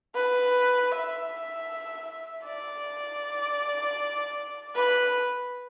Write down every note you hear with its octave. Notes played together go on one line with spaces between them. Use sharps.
B4
E5
D5
B4